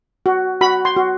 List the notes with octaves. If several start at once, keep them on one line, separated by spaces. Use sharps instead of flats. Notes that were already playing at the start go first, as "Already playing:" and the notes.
F#4
F#4 B5
C6
F#4